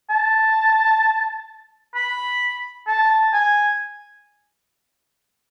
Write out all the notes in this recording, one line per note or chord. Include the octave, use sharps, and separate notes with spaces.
A5
B5
A5
G#5